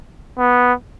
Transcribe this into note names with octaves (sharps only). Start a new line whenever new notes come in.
B3